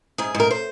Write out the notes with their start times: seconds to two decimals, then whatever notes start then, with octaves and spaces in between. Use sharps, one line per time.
0.18 G#2 G#4
0.34 G#2
0.40 A#4
0.51 C5